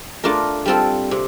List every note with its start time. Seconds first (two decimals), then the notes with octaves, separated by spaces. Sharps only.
0.24 A3 D4 F4 A#4
0.66 G3 C4 F4 A4
1.11 C3